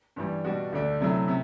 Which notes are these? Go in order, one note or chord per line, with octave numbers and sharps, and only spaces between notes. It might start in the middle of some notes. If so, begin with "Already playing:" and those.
G2 E3 G3
B2 G3 D4 F#4
D2 D3 A3 D4
C3 F#3 A3 E4
C3